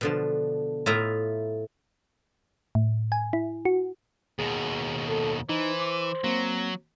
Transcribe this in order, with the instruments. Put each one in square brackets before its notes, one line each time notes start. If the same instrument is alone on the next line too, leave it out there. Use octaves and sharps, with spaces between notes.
[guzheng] B2 D3 F3
A2 E4 F4 D#5 E5 A#5
[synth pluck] A2
G#5
E4
F#4
[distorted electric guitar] D#2 B2 [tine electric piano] G#4
[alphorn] A4
[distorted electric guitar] E3 [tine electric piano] D#4 [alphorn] C5
[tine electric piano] D6
[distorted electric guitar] F#3 [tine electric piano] A#3 C4